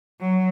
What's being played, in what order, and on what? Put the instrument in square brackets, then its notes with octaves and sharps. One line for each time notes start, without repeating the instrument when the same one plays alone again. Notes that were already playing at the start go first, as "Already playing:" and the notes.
[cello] F#3